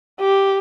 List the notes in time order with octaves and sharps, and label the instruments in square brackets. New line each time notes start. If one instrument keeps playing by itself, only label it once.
[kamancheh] G4